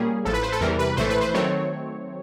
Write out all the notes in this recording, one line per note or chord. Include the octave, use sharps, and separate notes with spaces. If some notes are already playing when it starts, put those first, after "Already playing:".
Already playing: A#2 G3 A#3 C#4 G#4
A1 A2 F3 A4
B4
C5
A4
E2 C3 E3 G3 A#4
B4
A#1 A2 E3 A3 C5
B4
C5
D#3 F#3 A3 C4 C#5